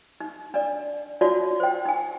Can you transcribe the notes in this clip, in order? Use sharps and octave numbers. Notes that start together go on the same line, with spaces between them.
D#4
D4 D5
D#4 F4 F#4 C#5 D5
C5 G5
D#4 G#5